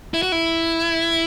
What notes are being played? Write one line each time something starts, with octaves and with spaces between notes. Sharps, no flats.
E4
F#4
E4